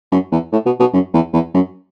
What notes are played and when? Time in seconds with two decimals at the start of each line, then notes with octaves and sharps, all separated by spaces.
0.12 F#2
0.32 E2
0.52 A2
0.66 B2
0.80 B2
0.93 F#2
1.14 E2
1.33 E2
1.54 F#2